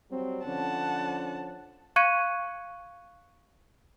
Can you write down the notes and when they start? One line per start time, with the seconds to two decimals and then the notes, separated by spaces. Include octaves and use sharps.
0.10 F#3 G3 C4
0.45 D3 F3 C#4 F#5 A5
1.96 F5 C#6 F#6 G#6 C#7 D#7